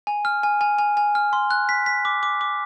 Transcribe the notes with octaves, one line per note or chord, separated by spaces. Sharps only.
G#5
F6
G#5
G#5
G#5
G#5
F6
C6
F#6
B6
B6
D6
D6
D6